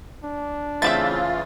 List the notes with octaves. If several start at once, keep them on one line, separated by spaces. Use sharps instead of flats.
D4
C#3 E3 A3 C4 F4 E5 A6